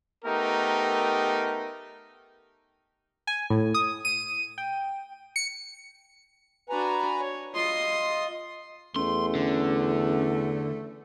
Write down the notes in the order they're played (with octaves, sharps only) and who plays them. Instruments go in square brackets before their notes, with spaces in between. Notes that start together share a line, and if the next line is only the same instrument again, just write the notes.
[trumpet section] A3 B3 D#4 G4 A#4
[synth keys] G#5
A2
D#6
D#7
G5
C#7
[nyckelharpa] D4 F#4 [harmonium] B4 G#5 A#5
[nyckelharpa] C#5
[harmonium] F4 D#5 [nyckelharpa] C6 D#6
[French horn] E2 [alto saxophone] A3 [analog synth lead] C#4 [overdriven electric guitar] C6
[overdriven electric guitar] D3